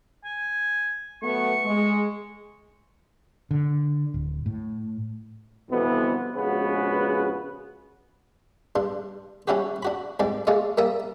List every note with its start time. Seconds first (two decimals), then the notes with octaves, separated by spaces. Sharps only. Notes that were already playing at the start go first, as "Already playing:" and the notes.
0.25 G#5
1.22 F#3 A3 B3 C#6
1.65 G#3
3.51 D3
4.14 D1
4.46 A2
5.70 C2 F2 B2 D3 E3 B3
6.35 A#1 C#3 G#3 B3 F#4 B4
8.76 G2 D4 C6
9.48 G3 C#4 D4 E4 F#4 G4
9.83 D4 F#4 B5
10.20 C2 G#2 G#3 D5 D6
10.47 G#3 A3 F4 D5 D#5
10.78 G3 A#3 A#4 E5 A5 D#6